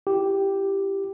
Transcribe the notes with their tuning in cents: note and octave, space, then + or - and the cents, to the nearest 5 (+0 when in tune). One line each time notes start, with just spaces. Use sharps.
E4 +30 G4 +0